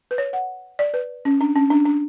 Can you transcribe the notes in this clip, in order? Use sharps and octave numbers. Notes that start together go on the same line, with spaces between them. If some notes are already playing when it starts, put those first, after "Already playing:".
B4
C#5
F#5
D5
B4
C#4
D4
C#4
D4
D4